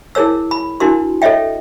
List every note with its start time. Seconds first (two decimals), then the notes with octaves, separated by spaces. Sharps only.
0.15 E4 G#4 A#4 C#5 E6
0.51 B5
0.80 D4 E4 F#4 A#4 C6
1.22 A4 C#5 D#5 E5 G5